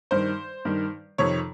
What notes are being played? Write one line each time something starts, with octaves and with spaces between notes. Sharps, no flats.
G2 D#3 C5
G2 D#3
F2 C3 D#3 C#5